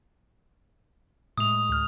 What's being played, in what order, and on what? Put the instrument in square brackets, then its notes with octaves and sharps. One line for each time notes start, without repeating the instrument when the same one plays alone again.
[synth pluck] A2 G#3 [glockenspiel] D#6 F7
[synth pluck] D2 F6